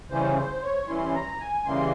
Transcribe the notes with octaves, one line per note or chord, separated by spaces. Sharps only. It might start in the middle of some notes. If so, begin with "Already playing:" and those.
C#3 E3 G3 C#4 C5
C5
C#5
E3 G3 C#4 E4 C6
A#5
G#5
C#3 E3 G3 A#3 C6